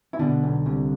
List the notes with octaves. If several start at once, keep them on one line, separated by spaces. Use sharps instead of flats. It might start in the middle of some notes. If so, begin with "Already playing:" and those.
E4
B2 D3 D4
B1
C2